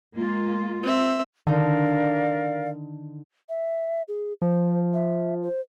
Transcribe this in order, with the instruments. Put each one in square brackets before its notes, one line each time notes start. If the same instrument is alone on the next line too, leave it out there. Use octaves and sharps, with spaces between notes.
[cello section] G#3 A#3 F4
[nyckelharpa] C4 E5
[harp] D3 D#4 [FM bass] D#3 [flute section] A#4 D5 F5
[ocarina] E5
G#4
[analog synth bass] F3 [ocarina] C5
[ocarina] E5
C5